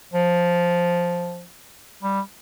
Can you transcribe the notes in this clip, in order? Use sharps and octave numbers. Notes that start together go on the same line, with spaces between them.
F3
G3